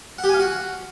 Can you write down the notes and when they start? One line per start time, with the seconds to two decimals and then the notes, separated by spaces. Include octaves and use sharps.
0.18 F#5
0.24 G4
0.29 G#5
0.34 F5
0.39 F#4